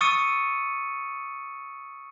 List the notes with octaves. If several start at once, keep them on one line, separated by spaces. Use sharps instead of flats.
C#6 D#6 E6 A6 C#7 D#7